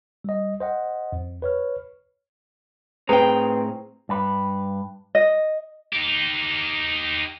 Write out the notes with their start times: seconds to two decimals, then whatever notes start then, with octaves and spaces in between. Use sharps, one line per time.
0.24 G3 D#5
0.60 C5 D#5 F#5
1.12 F2
1.42 B4 C#5 F6
3.09 A2 C4 G#4 B4 G5 A#5
4.09 G2 B4
5.15 D#5
5.93 D#4 G4